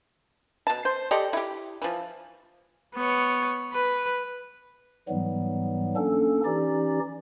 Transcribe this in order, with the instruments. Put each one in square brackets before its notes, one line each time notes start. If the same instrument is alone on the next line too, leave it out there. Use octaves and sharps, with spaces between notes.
[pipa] B2 A5
C5
G4 A4 D5 D#5
E4 G4
E3 F3
[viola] B3 C#5
B4
[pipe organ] G#2 E3 F#3 G3 B3
A#3 C#4 D4 A4
E3 C#4 D#4 G4 D5